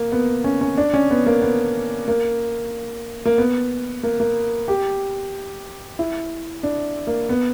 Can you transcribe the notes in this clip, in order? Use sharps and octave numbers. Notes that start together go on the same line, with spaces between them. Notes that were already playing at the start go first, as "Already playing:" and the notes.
Already playing: A#3
B3
C#4
C#4
D4
C#4
B3
A#3
B3
A#3
A#3
B3
A#3
A#3
G4
E4
D4
A#3
B3